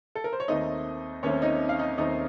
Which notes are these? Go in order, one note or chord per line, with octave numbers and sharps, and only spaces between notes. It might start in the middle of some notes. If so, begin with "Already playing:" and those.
A4
A#4
C5
C#5
D#2 D#3 A3 C4 D#4 D#5
D#2 D#3 A3 C4 C#4 C#5
D#4 D#5
F5
D#4 D#5
D#2 D#3 A3 C4 D#4 D#5